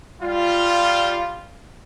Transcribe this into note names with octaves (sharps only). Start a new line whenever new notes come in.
G3 F4